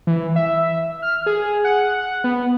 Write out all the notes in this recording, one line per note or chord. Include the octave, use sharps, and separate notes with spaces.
E3
E5
F6
G#4
F#5
B3